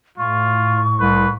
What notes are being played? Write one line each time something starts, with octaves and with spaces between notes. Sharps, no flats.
A2 F4 C#6
C2 B4